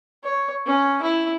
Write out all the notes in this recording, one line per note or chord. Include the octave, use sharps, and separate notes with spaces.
C#5
C#4
E4